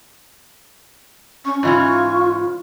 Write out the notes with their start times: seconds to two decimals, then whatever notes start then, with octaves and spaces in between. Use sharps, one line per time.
1.45 C#4 C#6
1.63 G#2 E3 C#4 F4